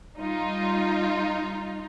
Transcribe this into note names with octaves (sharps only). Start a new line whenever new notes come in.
G3 D#4 F4